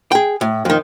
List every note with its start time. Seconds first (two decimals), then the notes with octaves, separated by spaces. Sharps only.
0.12 G#4 G5
0.41 A2
0.65 F2 D#3